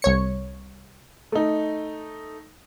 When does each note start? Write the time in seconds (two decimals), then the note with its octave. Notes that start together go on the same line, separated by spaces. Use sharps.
0.02 C2 C#5 C#7
1.32 A3 D#4